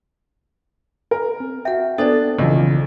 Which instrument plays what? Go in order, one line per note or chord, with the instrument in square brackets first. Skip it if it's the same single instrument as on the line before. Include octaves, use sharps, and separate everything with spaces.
[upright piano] A#4
[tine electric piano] C4
[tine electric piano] F#4 G5 [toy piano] E5 F#5
[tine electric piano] B3 B4 A6 [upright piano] D4 [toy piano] A4 C5 D5
[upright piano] B1 F3 [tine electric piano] C#3 E3 F4